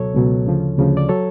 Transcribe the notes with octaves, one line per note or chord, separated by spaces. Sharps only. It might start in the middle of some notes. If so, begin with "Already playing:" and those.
Already playing: C#2 B2 F#3 A4 C#5
C#2 B2 F#3
D2 C#3 F3
D2 C#3 F3
D5
F#3 A4 C#5